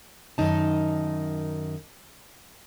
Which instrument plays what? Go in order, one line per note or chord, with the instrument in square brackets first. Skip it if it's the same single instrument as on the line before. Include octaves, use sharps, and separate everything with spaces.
[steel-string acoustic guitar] F#2 D#3 D#4 A5